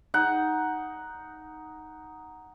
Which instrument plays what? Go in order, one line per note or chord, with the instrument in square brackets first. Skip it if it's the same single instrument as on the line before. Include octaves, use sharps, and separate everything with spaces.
[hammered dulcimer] D#4 F#5